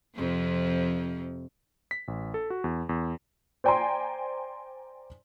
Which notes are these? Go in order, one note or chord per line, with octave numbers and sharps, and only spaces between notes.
F2 C3 F3
B6
A1
A4
F#4
E2
E2
C5 D5 G5 G#5 A#5 C6